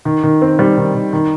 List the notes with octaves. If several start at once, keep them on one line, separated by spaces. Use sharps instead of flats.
D#3
D#3
C4
G3
D#3
D#3
D#3